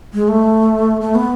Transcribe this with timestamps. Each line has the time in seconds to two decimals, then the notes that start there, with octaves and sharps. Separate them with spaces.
0.14 G#3
0.28 A3
1.01 A3
1.15 B3